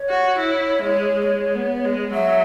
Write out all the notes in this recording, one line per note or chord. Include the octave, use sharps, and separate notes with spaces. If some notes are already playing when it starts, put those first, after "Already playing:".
Already playing: C#5
F#4
E4
G#3
G#3
B3
G#3
F#3 E5